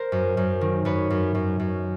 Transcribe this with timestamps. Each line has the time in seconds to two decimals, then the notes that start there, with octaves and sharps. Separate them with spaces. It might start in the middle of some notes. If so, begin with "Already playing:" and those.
Already playing: A#4 C5
0.12 F#2
0.37 F#2
0.61 D#3
0.85 F#2 B4 C#5
1.10 F#2
1.35 F#2
1.60 F#2